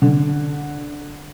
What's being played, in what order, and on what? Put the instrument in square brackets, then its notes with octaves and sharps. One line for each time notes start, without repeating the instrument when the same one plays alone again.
[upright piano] D3